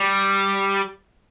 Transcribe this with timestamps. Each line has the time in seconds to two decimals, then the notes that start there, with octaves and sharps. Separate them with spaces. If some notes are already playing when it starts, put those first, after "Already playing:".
Already playing: G3